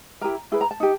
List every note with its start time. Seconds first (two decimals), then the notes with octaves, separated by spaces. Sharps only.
0.21 E4 G4 A#4 A#5
0.52 E4 G#4 B4
0.61 A#5
0.71 A5
0.80 D#4 G4